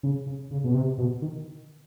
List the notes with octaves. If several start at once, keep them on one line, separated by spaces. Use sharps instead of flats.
C#3
C#3
C#3
B2
C3
B2
D#3